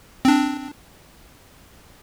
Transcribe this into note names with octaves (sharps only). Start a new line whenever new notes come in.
C4 D4